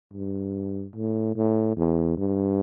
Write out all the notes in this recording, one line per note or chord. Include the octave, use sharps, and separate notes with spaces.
G2
A2
A2
E2
G2